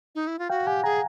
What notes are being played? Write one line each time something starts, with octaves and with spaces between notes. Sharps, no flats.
D#4
E4
F4
F#4 F5 G5
G4 F#5 G#5
G#4 G#5 A#5